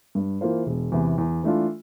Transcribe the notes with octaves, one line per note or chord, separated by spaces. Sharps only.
G2
E3 A#3 F4 C5
E1
E2 C3 E3
E2
E3 A3 D4 F4